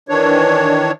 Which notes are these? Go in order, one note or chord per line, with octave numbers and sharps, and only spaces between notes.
D#3 E3 D4 C#5